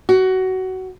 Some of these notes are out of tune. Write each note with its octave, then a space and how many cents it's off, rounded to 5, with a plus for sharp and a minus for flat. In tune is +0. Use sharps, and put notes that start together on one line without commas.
F#4 +20